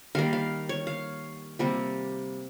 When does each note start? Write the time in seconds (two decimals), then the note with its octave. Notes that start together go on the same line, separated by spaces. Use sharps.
0.15 D#3 G3 A#3 F5
0.33 F5
0.69 C#5
0.87 F5
1.59 C3 G3 A#3